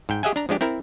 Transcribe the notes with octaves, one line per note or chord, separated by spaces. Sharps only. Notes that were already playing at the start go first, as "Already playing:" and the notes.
G#2 G5
G4 G#4 D#5 E5 F#5 G#5
D4 A#5
F3 G#3 D4 G4
C4 E4 A#4